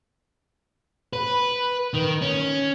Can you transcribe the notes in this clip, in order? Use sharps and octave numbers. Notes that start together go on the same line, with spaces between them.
B4
D#3
C#4